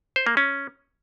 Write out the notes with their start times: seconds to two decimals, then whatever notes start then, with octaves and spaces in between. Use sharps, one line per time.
0.16 C5
0.27 A#3
0.37 C#4